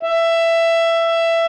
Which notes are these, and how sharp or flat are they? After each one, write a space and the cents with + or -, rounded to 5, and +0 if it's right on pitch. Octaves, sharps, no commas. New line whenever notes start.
E5 +15